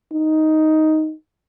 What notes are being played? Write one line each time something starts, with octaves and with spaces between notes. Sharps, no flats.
D#4